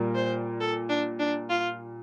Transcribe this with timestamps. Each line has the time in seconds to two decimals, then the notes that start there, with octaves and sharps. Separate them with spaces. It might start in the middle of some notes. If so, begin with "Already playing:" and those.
Already playing: A#2 G3 A#3
0.15 C5
0.61 A4
0.90 D4
1.20 D4
1.50 F4